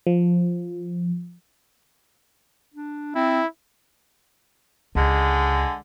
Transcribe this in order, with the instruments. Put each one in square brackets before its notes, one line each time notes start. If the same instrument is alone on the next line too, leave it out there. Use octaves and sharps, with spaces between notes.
[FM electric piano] F3
[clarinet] D4
[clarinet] C4 [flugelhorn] E4
[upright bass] C#2 [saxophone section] D3 G#3